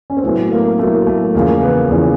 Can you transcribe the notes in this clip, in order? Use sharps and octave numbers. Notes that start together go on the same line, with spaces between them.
C#4
C4
A2 F#3 A3 B3
A#3
A2 F#3 A3 A#3
A3
E2 C#3 F3 A#3
B3
E2 C#3 F3